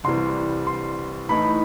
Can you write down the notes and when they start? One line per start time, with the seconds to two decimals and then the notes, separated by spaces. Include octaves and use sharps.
0.04 C2 C3 E3 G3 C6
0.67 C6
1.29 A2 E3 A3 D#4 B5